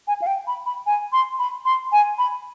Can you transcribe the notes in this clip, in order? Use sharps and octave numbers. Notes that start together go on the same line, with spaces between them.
G#5
F5
G5
B5
B5
G#5
C6
B5
C6
G#5
B5